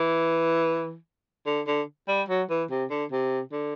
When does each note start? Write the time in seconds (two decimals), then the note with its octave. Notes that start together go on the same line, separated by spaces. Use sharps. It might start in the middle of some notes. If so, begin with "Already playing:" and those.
Already playing: E3
1.46 D3
1.67 D3
2.08 G3
2.29 F#3
2.50 E3
2.70 C3
2.90 D3
3.12 C3
3.52 D3